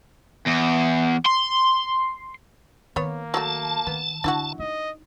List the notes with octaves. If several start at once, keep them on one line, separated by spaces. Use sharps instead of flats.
E2
C6
D#3 A#3 B3 C#5
F#3 G#3 A3 A5
D#3 B3
D3 D4 E4 F#4
D#4 D#5